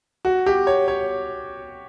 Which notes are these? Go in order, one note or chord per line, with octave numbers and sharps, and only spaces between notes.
F#4
G4
C#5
C#5